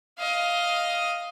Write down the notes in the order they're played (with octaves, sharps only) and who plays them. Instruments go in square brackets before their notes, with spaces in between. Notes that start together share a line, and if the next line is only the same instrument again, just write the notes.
[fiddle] D#5 F5